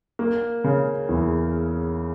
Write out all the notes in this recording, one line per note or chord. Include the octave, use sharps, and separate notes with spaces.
A#3
C#3
E2